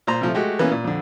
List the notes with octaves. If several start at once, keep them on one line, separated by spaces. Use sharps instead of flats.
A#2 C5 A#5
C3 F3 A3
G#3 A3 F#4 G4
E3 A#3 B3 C#4
A#2
F2 D3